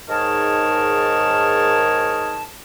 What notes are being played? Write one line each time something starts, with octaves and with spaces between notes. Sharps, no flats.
G#2 D#3 G#4 A#4 C#5 A5